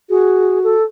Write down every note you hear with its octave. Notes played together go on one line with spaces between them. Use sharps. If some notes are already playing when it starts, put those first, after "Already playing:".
F#4 G#4
A4